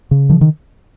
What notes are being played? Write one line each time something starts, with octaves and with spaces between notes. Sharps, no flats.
C#3
D#3 F3
D#3